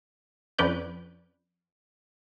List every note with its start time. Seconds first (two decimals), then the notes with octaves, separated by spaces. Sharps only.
0.59 F2 C#4 B4 D5 G6